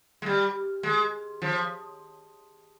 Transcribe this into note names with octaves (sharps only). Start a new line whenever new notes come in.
G#3
G3
G#3
F3